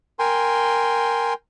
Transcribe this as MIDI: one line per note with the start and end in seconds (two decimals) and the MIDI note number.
0.19 1.34 70
0.19 1.34 79
0.19 1.34 80
0.19 1.34 84